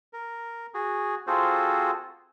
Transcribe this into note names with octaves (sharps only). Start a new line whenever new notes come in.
A#4
F#4 G#4
C4 F4 F#4 G#4 A4 C5